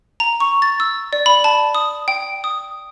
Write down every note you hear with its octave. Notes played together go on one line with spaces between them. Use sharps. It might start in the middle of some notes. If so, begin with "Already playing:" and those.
A#5
C#6
A6
E6
D5
B5
A5
D#6
G5
D#6